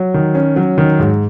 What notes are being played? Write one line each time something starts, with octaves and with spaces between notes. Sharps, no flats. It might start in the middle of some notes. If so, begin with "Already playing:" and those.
Already playing: F#3
D#3
C#4
F#3
D#3
G#2